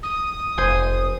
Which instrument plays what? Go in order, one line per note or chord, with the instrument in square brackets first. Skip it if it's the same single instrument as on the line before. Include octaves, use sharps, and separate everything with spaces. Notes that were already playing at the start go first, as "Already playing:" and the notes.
[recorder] D#6
[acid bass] F1 [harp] C5 G#5